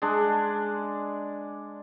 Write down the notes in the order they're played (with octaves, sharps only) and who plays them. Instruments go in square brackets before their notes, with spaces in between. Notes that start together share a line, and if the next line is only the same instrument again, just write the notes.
[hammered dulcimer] G#3 D4